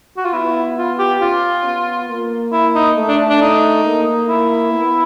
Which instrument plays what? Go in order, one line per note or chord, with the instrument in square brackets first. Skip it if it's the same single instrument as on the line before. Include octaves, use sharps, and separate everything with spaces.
[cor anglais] F#4
F4
[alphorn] B3 [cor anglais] E4
[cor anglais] F4
G4
[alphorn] C#4 [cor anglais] F4
[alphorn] B3
A#3
[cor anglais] E4
D#4
[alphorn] A3
[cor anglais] D4
D4
D#4
[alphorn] A#3
[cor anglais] E4
[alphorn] B3